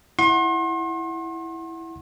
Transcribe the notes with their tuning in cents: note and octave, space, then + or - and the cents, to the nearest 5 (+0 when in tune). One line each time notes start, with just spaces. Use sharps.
E4 +0 F#5 +0 C6 +40